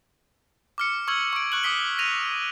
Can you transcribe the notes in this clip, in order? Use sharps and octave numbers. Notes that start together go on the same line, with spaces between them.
D6 F6 C#7
C#6 E6 F6 G#6 F#7
C#6 D7
C#6 F#6 F#7
D6 D#6 B6 G7
A#6 D#7 F7